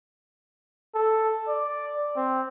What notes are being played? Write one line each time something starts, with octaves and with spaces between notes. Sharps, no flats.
A4
D5
C4